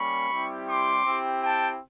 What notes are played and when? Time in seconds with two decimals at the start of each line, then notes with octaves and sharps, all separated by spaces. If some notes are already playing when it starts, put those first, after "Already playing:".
Already playing: G3 A#3 C#4 B5 C#6
0.30 G3 C4 E4 G4
0.67 C6 D6
1.05 C4 E4 G4
1.43 G5 A5